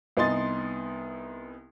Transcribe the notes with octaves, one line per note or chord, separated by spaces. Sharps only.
C2 B3 D#4 G#5 C6 A6